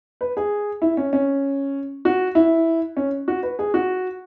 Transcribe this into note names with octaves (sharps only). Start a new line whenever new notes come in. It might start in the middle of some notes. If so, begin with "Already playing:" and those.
B4
G#4
E4
C#4
C#4
F#4
E4
C#4
F#4
B4
G#4
F#4